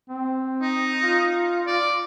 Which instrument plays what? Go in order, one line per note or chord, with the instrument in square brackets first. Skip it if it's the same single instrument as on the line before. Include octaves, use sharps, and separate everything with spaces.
[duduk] C4
[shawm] D#4
[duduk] F4
[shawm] D5